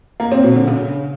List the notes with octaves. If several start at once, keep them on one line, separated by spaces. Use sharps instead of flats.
A#3
C4
B2
D3
C#3